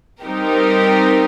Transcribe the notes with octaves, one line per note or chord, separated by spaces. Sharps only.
G3 C4 D#4 G4 A#4